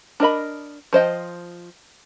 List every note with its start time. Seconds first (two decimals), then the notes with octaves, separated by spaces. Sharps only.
0.20 D4 A#4 D#5 B5
0.93 F3 C5 D#5 G5